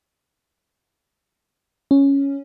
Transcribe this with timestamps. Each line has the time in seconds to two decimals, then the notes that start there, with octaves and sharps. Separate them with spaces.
1.91 C#4